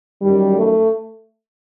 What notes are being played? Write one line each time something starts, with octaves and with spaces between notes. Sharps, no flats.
F#2 D#3 G3
A3